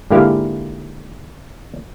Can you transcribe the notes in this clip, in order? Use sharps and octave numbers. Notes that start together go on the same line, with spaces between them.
G#2 D3 A#3 E4 G4 F5